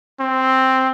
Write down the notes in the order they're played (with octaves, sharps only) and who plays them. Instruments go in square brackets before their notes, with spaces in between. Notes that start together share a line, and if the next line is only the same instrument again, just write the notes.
[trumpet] C4